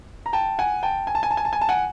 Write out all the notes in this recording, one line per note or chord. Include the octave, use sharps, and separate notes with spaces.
A#5
G5 A5
F#5 G#5
G5 A5
G#5
A5
G#5
A5
G#5
A5
G#5
A5
F#5 G#5